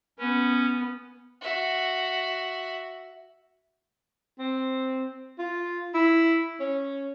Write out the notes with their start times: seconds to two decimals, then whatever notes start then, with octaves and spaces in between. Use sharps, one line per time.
0.19 B3 C#4
1.41 F#4 E5
4.39 C4
5.39 F4
5.94 E4
6.60 C#4